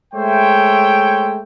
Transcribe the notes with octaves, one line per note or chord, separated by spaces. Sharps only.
G#3 A3 C5 C#5 E5 G5